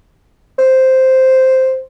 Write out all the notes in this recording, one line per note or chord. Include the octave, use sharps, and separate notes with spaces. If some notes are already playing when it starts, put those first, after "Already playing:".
C5